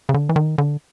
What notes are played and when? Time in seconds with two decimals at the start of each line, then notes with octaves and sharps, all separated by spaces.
0.09 C#3
0.14 D3
0.29 E3
0.36 D#3
0.58 D3